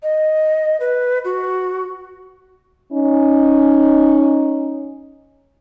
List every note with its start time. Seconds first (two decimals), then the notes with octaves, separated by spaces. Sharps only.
0.03 D#5
0.80 B4
1.25 F#4
2.92 C#4 D#4